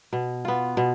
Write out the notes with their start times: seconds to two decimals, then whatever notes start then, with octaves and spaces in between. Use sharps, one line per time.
0.13 B2
0.45 B3 F4
0.77 B2